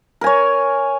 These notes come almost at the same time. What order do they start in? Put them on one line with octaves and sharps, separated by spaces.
A#4 G#5 C#5